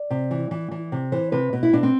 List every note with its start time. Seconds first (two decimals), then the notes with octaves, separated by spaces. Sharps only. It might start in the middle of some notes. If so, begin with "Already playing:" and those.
Already playing: D5
0.11 C3
0.31 E3
0.51 E3
0.71 E3
0.92 C3
1.12 E3 C5
1.32 C3 B4
1.53 B2
1.63 E4
1.73 B2 D4
1.83 C4